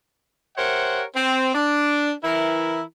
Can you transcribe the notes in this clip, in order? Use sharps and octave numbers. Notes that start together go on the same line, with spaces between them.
G4 A#4 C5 C#5 E5 F#5
C4
D4
E3 E4 A#4